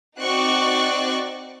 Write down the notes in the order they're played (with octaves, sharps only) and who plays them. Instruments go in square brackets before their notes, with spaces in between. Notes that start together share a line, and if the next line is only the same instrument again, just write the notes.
[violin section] C4 D#4 F#4 D5 C#6 F#6